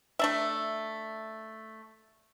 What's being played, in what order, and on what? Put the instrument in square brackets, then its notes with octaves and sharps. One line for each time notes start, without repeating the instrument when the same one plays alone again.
[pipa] A3 D4 E5